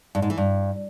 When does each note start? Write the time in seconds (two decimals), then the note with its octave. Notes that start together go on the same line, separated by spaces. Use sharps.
0.15 G2
0.22 G#2
0.30 E3
0.38 G2